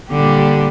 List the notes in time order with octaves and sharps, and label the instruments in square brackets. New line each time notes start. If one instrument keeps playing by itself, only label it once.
[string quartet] A#2 G3 D4 G4 [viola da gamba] D3